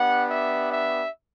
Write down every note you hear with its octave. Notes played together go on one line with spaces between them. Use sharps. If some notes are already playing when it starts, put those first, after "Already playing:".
Already playing: B3 D4 G4 F#5
E5
E5